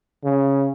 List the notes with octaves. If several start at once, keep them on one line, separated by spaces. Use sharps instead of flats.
C#3